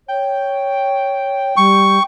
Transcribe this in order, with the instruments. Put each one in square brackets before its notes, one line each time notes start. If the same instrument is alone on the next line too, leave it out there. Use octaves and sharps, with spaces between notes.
[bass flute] C#5 [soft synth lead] G5
[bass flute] G3 [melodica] C#6